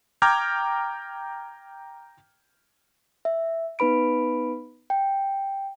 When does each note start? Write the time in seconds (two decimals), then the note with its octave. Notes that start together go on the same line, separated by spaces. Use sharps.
0.22 G5 A#5 D6 F6 G6 G#6
3.25 E5
3.79 B3 D#4 B4 B5 D7
4.90 G5